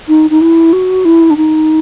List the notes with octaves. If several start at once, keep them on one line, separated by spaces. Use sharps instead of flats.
D#4
D#4
E4
F#4
E4
D4
D#4